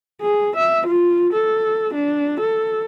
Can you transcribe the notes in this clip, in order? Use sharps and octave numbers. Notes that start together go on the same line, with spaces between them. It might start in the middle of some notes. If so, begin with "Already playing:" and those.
G#4
E5
F4
A4
D4
A4